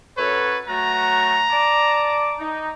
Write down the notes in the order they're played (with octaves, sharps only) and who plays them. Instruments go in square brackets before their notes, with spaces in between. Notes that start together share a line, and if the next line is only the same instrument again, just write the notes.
[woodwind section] F#2 A4 C#5 [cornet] B4
[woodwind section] F#3 A3 F#4 [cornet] A#5
[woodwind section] D5 A5 D6
D#4